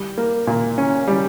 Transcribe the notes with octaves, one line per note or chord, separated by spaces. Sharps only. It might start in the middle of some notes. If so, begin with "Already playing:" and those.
Already playing: G3
A#3
A#2
C#4
G3